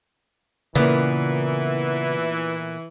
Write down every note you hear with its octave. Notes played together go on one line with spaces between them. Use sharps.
A#2 C#3 E3 A#3 B3